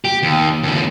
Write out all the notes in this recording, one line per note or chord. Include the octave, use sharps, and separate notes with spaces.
G4
D#2
D#2 C#3